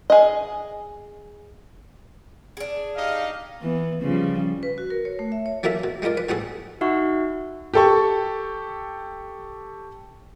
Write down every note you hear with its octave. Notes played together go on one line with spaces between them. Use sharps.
G#4 D#5
D4 G#4
D#4 G4 D#5 F5
E3 B3
C#3 F3 G3
B4
F#4
A#4
C#5
A3
E5
C#5
E3 F#3 A#3 F#4 A4 E5
B2
G3 G#3 F4 A#4 D5
B4
A2 G3 B3 F#4 G#4 A4
D#4 F#4 E5 F#5 C#6
G4 A4 C#6